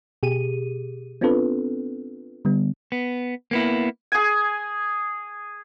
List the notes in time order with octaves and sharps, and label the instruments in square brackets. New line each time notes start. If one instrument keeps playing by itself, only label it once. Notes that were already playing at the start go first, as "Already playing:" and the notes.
[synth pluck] B2 G4 G#4 D#7
B3 C4 D4 F4 A4 B4
D3 G3 B3
[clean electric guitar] B3
A#3 B3 E4
[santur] G#4 G#5